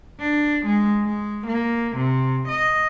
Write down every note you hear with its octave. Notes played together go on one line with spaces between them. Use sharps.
D4
G#3
G#3
A#3
C3
D#5